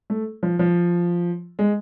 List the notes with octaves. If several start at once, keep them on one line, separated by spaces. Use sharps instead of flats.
A3
F3
F3
G#3